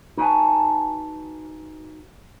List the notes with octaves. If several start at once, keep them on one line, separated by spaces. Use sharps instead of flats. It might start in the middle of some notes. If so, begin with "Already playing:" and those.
D#4 F#4 B4 D5 G#5 A5